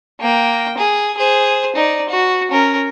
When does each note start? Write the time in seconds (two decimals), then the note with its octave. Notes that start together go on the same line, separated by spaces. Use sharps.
0.20 A#3 G5
0.78 G#4
1.17 G#4 C5
1.76 D#4 D5
2.09 F#4
2.51 C#4 A#4